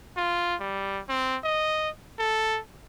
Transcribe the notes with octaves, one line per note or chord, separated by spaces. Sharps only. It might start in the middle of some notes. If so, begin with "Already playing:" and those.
F4
G3
C4
D#5
A4